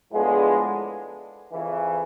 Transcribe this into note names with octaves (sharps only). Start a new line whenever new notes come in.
A2 F3 G#3 B3 D4
F2 C#3 E3